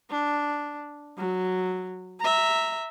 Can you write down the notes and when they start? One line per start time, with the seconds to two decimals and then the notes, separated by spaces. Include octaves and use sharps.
0.10 D4
1.18 F#3
2.20 E5 A#5